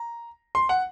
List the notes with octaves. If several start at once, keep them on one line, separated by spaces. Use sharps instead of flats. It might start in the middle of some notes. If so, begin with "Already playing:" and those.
Already playing: A#5
C6
F#5